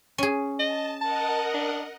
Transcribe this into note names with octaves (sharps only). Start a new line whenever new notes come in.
C#4 G#4
D#5 A5
A#4 D#5 F#5 A5
D4